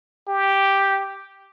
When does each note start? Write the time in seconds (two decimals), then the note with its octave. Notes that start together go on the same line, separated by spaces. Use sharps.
0.28 G4